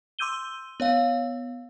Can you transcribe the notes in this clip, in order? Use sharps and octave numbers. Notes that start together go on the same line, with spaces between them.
C6 D6 E6 G6 D#7 G7
B3 C#5 F5